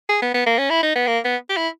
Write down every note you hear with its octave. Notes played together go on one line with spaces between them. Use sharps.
G#4
B3
B3
A#3
C#4
E4
D#4
B3
A#3
B3
G4
E4